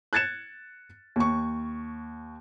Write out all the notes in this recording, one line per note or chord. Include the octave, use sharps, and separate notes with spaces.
F#6 G#6 A6 C#7 E7
D#2 C#6